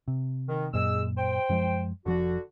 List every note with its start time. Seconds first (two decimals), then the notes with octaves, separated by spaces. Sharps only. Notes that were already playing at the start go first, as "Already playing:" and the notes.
0.08 C3
0.48 D#3
0.74 F#2 A#2 G#3 E6
1.18 C5 G5
1.49 F#2 F3 G#3
2.06 F1 D3 F3 F#4